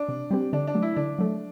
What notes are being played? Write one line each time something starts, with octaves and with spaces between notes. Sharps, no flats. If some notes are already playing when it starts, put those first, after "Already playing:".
Already playing: D4
C3
G3 C4 G4
D3 D4
D4
F#3 A3
E4
D3 D4
F#3 A3